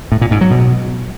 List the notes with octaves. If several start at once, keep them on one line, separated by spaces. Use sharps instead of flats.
A2
A#2
G#2
F#3
B2